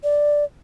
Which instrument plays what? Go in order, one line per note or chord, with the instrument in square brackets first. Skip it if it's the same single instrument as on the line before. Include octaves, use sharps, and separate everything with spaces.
[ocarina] D5